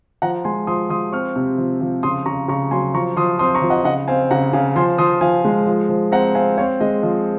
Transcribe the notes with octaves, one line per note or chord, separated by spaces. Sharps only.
F3 F#5 A#5
G#3 G#5 C6
F3 C6 D#6
F3 C6 D#6
C4 C#6 F6
C3
F3
F3
C#3 C6 D#6
C#3 A#5 C#6
C#3 A#5 C#6
F#3 G#5 C6
F3 A#5 C#6
F3 C6 D#6
C4 C6 D#6
A#5 C#6
F3
D#5 F#5
C#3 D#5 F#5
C4 F5 G#5
C#3 F#5 A#5
C#3 F5 G#5
F3 G#5 C6
F3 C6 D#6
F3 F5 G#5
G#3
F3
F3
C4 F#5 A#5
C4 F5 G#5
C4 C#5 F5
G#3 D#5
F3 D#5